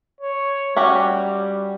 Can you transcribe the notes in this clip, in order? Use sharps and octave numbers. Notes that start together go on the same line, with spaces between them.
C#5
G3 C#4 F#4 G4